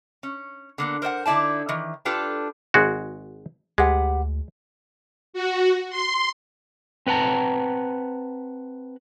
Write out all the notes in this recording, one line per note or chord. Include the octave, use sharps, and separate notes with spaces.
C#4
D3 A#3 B3
A#4 C5 D#5 F#5
D3 D#4 E4 D5 A5
D#3 E3
D4 F4 G4 A4 B4
G#1 G#3 F#4
D2 G#3 G4 B4 F#5
F#4
C6
C4 B4 F#5 A5 A#5